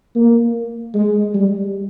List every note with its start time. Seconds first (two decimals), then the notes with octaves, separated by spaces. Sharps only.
0.15 A#3
0.94 G#3
1.34 G3